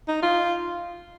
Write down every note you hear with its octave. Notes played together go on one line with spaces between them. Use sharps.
D#4
F4